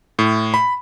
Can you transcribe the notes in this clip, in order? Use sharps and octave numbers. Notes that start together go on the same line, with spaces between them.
A2
B5